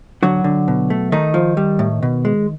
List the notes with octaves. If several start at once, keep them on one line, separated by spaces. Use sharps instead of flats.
D3 F#3 F#4
D3
B2
A3
D#3 A3 D#4
F3
G3
A2
B2
G#3